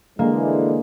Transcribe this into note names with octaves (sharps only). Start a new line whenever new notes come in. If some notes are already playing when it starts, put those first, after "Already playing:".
D3 E3 G#3 A#3